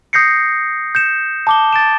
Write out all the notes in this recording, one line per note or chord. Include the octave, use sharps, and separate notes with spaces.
D#6 G6 A#6 C7 C#7
G6 C#7 E7
A5 D6 G7
A6 D7 E7